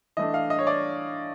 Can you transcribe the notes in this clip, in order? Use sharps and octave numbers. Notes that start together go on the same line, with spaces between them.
E3 A3 D4 D#5
F5
D#5
C#5
D5